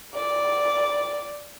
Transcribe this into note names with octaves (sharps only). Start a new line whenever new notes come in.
D5